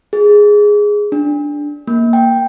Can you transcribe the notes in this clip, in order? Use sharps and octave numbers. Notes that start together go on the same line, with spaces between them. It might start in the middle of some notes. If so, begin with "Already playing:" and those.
G#4
D4
A#3
G5